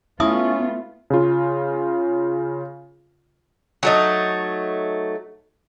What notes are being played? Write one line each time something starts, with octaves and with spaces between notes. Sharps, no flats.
A3 B3 C#4 E4 F4 E5 D#6
C#3 F4
F#3 A3 D#4